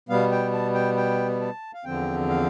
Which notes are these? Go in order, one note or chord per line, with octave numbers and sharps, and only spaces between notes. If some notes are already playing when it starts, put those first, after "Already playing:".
B2 G3 B3 F5
G5
A5
G5
G5
A5
F5
E2 D3 F3 C4 G5
F5